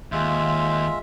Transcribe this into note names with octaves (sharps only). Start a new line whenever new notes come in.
D#2 G#3 F4 E5